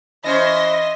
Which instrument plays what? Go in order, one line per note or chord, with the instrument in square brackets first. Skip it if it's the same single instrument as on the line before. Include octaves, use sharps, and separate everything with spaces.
[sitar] E3 C#4 C5 [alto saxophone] D#5 [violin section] E5 C6 A#6